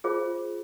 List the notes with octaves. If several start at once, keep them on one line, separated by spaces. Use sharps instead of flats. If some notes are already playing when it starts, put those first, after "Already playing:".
F4 G#4 C5